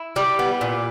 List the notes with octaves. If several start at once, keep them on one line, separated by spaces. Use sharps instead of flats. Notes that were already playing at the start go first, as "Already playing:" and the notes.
Already playing: E4
G3
B3
A#2